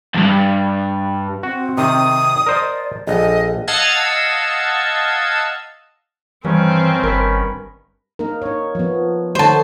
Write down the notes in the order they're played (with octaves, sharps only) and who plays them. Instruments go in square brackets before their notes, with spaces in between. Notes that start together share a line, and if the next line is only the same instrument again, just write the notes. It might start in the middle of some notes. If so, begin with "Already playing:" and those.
[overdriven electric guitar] E2 G2
[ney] C4 [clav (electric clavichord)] F#4
[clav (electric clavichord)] C3 D#3 [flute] D#6
[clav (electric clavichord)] A#4 C5 D#5 [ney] D5
[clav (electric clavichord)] A#1 [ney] A4 [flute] D#5
[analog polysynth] D#5 F5 F#5 A5 E6 G#6
[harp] G2 [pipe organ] D#3 C#4 [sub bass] E3 [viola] C4
[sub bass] G1 [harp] A#4 B4
[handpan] A#3 D#4 A#4
D#4 C#5
F3 B3
[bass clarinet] D3 [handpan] D#4 C#5 [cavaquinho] C5 A5